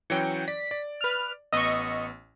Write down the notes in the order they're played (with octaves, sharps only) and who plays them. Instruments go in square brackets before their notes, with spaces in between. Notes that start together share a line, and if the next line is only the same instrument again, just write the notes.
[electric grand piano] E3 F#3 C#4 [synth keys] G5 C#7
[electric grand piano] D5 [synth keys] B6
[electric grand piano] D5
[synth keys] B4 F6
[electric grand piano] A1 B3 E6 [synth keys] D#5 C#6